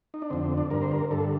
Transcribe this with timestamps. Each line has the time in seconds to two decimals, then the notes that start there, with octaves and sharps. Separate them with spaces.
0.14 D#4
0.22 D4
0.30 F2 D3 C4
0.45 C4
0.57 D4
0.70 G2 D3 A#4
0.82 C5
0.91 A#4
1.11 G2 D3 A4